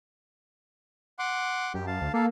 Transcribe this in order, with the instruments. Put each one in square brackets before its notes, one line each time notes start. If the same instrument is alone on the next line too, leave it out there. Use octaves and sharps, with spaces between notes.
[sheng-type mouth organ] F#5 C6 D6
[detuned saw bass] F#2 [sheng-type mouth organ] G4
[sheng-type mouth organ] F5 A5
[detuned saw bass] D2
[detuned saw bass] A#3 [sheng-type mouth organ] A4 F5